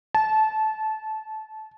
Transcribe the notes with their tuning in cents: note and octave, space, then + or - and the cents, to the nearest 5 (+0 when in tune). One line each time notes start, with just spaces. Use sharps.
A5 -20